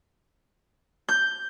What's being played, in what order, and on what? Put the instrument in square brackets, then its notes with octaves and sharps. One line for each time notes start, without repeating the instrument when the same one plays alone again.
[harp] G6